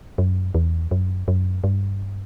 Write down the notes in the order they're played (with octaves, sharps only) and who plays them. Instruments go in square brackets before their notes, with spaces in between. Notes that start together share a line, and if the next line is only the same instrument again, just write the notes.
[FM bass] F#2
E2
F#2
F#2
G2